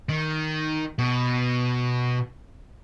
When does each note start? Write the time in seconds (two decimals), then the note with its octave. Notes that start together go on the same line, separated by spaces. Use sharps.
0.09 D#3
0.99 B2